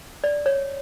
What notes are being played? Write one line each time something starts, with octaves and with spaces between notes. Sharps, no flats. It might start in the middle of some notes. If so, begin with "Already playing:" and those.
D5
C#5